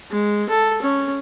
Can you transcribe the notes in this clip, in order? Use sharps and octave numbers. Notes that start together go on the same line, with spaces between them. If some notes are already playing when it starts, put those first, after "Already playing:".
G#3
A4
C#4